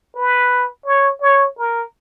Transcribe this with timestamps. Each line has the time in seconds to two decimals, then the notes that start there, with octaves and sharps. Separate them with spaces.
0.15 B4
0.86 C#5
1.21 C#5
1.57 A#4